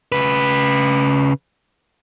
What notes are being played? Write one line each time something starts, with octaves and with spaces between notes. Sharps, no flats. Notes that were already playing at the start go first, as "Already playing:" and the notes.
C#3 B4